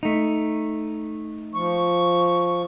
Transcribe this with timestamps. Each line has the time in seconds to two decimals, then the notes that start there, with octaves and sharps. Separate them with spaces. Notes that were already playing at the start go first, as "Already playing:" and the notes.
0.03 A3 D#4
1.54 F3 C#6